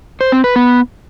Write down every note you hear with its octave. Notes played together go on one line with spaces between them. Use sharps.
C5
C4
B4
B3